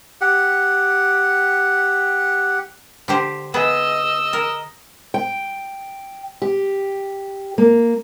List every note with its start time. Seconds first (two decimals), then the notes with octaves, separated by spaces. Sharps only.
0.21 G4 F#5
3.08 D3 G4 C5
3.54 B3 G#4 D#5 E6
4.33 A#4
5.14 G5
6.42 G4
7.58 A#3